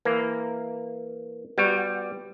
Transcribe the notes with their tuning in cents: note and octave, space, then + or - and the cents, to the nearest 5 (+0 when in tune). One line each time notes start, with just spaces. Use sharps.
E3 +0 A#3 -5
G3 +0 B3 +0 F#4 -15